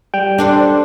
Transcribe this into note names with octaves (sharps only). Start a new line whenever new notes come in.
G3 G5
D4 A4 C5